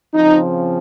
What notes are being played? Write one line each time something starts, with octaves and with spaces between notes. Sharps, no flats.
C#3 F3 C4 D#4